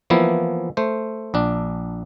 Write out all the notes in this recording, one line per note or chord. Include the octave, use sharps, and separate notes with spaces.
E3 F3 A#3 B3 E4
A3 C5
A#1 D4